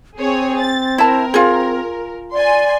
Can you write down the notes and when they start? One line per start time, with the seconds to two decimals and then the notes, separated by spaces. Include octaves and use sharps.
0.18 C4 G#4 C#5
0.61 A6
0.98 E4 A#4 A5
1.34 F4 G#4
2.33 D5 G#5 C6